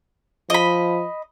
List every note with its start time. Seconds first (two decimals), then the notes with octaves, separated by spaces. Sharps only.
0.50 F3 D#5 B5